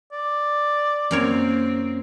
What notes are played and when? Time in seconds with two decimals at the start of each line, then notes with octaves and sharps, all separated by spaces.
0.12 D5
1.11 F#2 A#3 C4 A#4 C#5